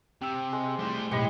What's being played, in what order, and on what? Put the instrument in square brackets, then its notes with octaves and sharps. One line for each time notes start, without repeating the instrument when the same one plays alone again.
[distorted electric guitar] C3 [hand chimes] G5 E6
[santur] G#3
[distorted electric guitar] G3 C5 [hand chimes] A3 E4
[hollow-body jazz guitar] B1 A2 [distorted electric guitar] G#3 [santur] G4 D#5 B5 [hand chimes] C#7